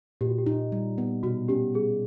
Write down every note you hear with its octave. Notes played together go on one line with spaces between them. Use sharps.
A#2 G4
F#4
G4
D#4
G3
B3
B2 F#4
C#4 G4
G3 G#4